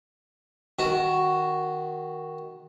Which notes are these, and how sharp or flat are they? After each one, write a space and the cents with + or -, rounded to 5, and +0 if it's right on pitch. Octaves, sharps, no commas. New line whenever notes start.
D#3 +0 F#4 +0